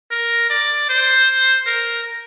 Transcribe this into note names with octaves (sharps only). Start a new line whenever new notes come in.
A#4
D5
C5
A#4